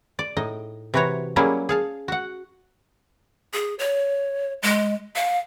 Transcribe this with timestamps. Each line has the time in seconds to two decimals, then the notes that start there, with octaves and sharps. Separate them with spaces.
0.19 D5
0.37 A2 D#4 D#5
0.94 C3 E3 F#4 B4 C#5 A#5
1.36 F#3 G3 A#3 C#4 E4 G#4
1.69 G#4 F5 A5
2.08 F#4 F#5
3.53 G#4
3.79 C#5
4.62 G#3
5.16 F5